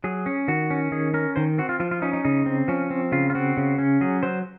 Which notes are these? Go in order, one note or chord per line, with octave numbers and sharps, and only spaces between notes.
F#3 G#4
C#4
D#3 F#4
C#4
D#3 G#4
C#4 A#4
D#3 C5
C4 F#4
F4
F3 F4
F4
C#4 D#4
D#4
C#3 D#4
C4
F3 C#4
C4
C#3 F4
F4
C4 F#4
C#3
C#4
F#3 G#4
F#3 C5